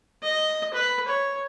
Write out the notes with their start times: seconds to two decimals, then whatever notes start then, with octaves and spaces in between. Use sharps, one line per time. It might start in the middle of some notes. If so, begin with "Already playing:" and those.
0.23 D#5
0.74 B4
1.08 C#5